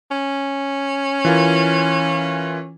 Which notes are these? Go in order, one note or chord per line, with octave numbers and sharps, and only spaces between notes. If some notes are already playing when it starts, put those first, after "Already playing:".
C#4
E3 F4 A#4